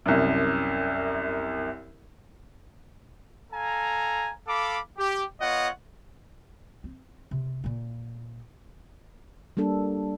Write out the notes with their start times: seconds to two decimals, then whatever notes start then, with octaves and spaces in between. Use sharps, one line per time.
0.06 C2 F#2
3.52 A4 F5 G#5 A#5
4.47 A4 F5 B5 D6
4.97 G4
5.39 B3 F4 C#5 D#5 F#5
6.84 C4
7.31 C3
7.64 A#2 A#3
9.57 G3 A#3 D4 A4